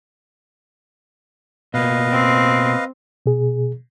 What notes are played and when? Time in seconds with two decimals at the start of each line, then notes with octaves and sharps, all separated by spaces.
1.74 B2 A#3 B4 D#5 F5
2.10 C4
3.26 B2 G#4